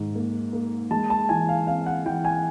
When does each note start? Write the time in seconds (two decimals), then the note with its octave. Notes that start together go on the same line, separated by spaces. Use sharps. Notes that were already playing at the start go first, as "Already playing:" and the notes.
Already playing: G#2 D#3
0.15 A#3
0.53 A#3
0.91 G#3 A5
1.10 A5
1.29 E3 G#5
1.49 F5
1.67 C4 F5
1.86 F#5
2.05 E3 G5
2.25 G#5